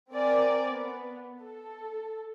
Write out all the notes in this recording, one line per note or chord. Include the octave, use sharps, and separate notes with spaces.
C4 A#4 D5 G#5
B3
A4